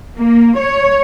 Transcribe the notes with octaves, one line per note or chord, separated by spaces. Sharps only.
A#3
C#5